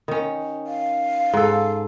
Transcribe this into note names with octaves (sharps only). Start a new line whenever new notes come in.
D#3 C#4
F5
G#2 A4